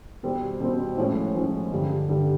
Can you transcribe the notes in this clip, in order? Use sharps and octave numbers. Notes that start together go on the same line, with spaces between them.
B2 G3 C4
B2 G3 C4
A2 F3 G#3 C#4
A2 F3 G#3 C#4
G2 D3 G3
G2 D3 G3